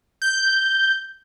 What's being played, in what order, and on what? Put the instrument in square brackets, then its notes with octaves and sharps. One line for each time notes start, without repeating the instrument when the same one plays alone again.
[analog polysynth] G6